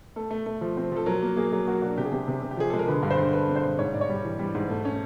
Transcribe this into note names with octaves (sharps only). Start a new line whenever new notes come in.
A3 A4
A3
A3
F3
C4
F3 A4
F#3 A#4
A#3
A#3 G#4
F#3 G#4
A#3 F#4
D4 F#4
C3 G4
G#4
C3 G4
C3
C3
G4
F3 G#4
G#3 A4
A#4
D3 B4
G2
C5
D3
D3 B4
C4
C5
G2
G#2 C#5
G#2 D5
C#5
G3
E3
G3
G#2
A3
C#4